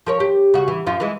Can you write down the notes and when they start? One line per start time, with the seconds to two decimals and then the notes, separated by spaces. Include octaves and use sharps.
0.06 F3 A#4 C#5
0.20 G4
0.54 C#3 F#4
0.68 E3
0.86 F#2 F3 F4
1.00 E3 G#3